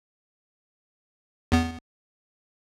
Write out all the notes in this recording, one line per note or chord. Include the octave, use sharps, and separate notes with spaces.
E2 B3